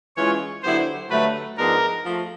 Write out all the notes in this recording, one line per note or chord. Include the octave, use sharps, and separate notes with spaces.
E3 G#3 C#4 F4 C#5
D3 F#3 B3 E4 G4 C5
G2 D3 F#3 A3 B4
G#2 F3 G#3 B3 D4 A#4
F3 A3